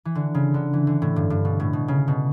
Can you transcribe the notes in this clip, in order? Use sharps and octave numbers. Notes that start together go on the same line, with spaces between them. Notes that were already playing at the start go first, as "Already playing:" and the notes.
E3
D3
C#3
D3
E3
D3
A2
G2
G2
B2
A2
B2
C#3
B2